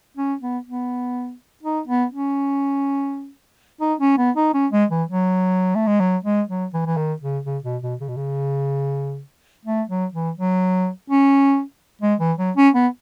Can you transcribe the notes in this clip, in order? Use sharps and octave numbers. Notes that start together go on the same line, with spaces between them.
C#4
B3
B3
D#4
B3
C#4
D#4
C#4
B3
D#4
C#4
G#3
E3
F#3
A3
G#3
F#3
G#3
F#3
E3
E3
D#3
C#3
C#3
B2
B2
C#3
B2
C#3
A3
F#3
E3
F#3
C#4
G#3
E3
F#3
C#4
B3